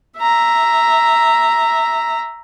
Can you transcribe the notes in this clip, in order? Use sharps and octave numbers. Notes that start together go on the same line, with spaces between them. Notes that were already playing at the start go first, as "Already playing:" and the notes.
E5 A#5